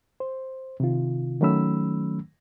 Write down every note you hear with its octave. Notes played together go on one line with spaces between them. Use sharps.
C5
C3 D#3 F4
D#3 F#3 A3 C#4 B5 E6